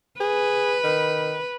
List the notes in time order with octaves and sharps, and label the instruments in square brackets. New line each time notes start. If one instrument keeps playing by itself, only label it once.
[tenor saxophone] G#4 [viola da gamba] B4
[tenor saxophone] D#3